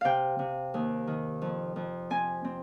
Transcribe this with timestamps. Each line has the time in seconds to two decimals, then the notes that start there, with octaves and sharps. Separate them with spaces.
0.01 C3 F5 G5
0.39 C3
0.74 D#2
1.07 D#3
1.42 F2
1.76 F2
2.10 C4 G#5
2.45 C4